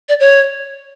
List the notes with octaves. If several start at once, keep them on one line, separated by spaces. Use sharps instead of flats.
D5
C#5